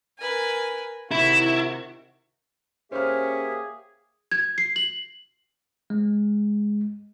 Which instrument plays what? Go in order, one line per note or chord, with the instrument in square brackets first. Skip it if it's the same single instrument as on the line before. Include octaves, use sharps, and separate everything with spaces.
[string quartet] A#4 B4 G#5
[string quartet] C3 D#3 F#4 [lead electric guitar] E4
[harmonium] A#3 G4 E5 [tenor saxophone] C#4 [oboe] G#4 [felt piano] C5 F6
[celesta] G#6
C7
F#7
[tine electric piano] G#3